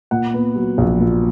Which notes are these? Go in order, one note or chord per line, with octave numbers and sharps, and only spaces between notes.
A#2 F#5
B3
F#3
A#1
A#2